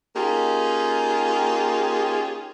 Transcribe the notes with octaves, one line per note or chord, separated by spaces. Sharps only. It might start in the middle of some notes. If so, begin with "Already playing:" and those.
A#3 C#4 D#4 F4 G4 G#4